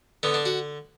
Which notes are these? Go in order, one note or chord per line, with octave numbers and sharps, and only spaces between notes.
D3 B3
D4
F#4